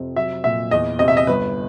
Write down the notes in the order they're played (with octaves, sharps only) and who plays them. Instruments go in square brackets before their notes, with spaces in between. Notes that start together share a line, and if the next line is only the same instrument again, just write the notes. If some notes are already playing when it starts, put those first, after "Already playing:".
Already playing: [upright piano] F2 C3
F#3 E5
A#2 E5
E2 D#5
C3 D#5
E5
D#5
G1 B4